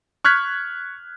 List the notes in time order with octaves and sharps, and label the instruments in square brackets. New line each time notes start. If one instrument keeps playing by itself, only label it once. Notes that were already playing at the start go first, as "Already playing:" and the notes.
[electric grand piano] C#6 F6 F#6 G#6 B6